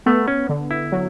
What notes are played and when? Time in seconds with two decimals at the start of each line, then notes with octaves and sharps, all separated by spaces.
0.06 A3 B3
0.28 C#4
0.49 D3
0.71 E4
0.92 F#3